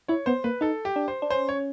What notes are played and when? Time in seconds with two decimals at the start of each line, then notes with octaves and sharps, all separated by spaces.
0.08 E4 C#5
0.26 B3 C5
0.44 A#3 B4
0.61 D#4 A4
0.85 G4
0.96 D4
1.08 C5
1.22 D4
1.30 C#4 C5
1.49 C#5